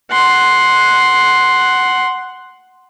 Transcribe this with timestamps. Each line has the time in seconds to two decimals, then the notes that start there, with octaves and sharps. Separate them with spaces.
0.11 F#5 C6